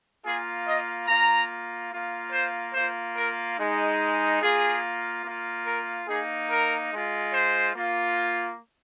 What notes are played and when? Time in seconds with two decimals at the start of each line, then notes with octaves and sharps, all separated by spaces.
0.25 A#3 F4 G#4
0.66 D#5
1.07 A#3 F4 A#5
1.92 A#3 F4
2.32 C5
2.74 A#3 F4 C5
3.16 A#4
3.58 G#3 D#4
4.41 A#3 F4 G#4
5.24 A#3 F4
5.66 A#4
6.08 A#3 D#4 G#4
6.50 A#4
6.91 G#3 F4
7.33 C5
7.74 A#3 F4